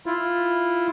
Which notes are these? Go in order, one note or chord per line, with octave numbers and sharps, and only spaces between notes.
E4 F4